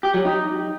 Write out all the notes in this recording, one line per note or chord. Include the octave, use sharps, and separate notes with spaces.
G4
F#3
D#4